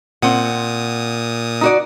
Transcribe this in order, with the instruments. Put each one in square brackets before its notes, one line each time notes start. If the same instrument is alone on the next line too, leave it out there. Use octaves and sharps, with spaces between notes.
[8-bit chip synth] A#2 D#6 [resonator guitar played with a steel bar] C4 F#5
[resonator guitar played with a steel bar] D#4 F#4 D5